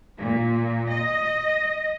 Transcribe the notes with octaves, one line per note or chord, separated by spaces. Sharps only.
A#2
D#5